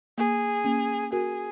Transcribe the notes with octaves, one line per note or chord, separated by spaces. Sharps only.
A#3 G#4
A#3 C#4
F#4 G#4 A#4